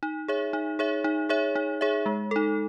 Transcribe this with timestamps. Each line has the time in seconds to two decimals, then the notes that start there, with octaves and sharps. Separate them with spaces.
0.03 D#4
0.28 G#4 C#5 E5
0.53 D#4
0.79 G#4 C#5 E5
1.04 D#4
1.29 G#4 C#5 E5
1.55 D#4
1.81 G#4 C#5 E5
2.06 G#3
2.31 D#4 A4